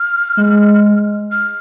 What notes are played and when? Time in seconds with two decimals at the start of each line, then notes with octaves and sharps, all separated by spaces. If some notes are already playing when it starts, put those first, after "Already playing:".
Already playing: F6
0.37 G#3
1.32 F6